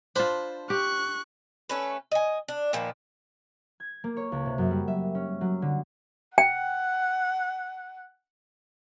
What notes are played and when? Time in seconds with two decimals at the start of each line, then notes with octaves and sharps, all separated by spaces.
0.16 D4 F4 C5 A5 B5
0.70 G4 C#6 F#6
1.69 A3 C#4 B4
2.12 D#5 G#5
2.48 D4
2.73 A#2 D#3 F3 B3
3.80 G#6
4.04 A#3
4.17 C#5
4.32 C#2
4.46 C3
4.58 F#2
4.71 G3
4.88 E5
5.15 C#4
5.41 F#3
5.62 D3
6.38 F#5 G5